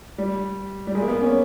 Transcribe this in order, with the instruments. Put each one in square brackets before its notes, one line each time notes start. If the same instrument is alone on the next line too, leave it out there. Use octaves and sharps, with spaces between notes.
[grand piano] G3
G3
G#3
A#3
B3
C#4